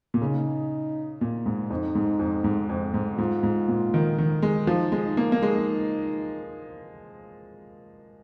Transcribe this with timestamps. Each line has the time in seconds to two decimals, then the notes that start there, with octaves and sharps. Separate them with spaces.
0.14 A#2
0.21 C#3 D#4
1.21 A#2
1.46 G#2
1.70 F2 D#4
1.95 G#2
2.19 F2
2.44 G#2
2.69 F2
2.94 G#2
3.18 G#2 F4
3.43 G#2
3.68 A#2
3.94 D#3
4.18 D#3
4.43 G#3
4.67 F3 D#4
4.92 G#3
5.05 D#4
5.17 A#3
5.32 A#3
5.41 G#3 D#4